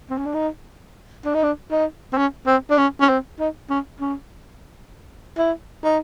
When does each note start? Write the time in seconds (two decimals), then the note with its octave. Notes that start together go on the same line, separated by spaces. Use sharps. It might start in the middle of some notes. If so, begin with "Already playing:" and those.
0.10 C4
0.18 C#4
0.26 D4
0.34 D#4
1.25 D4
1.34 D#4
1.43 D4
1.71 D#4
2.13 C4
2.17 C#4
2.47 C4
2.71 D4
2.78 C#4
3.01 C#4
3.09 C4
3.39 D#4
3.70 C#4
4.00 C#4
5.38 E4
5.84 D#4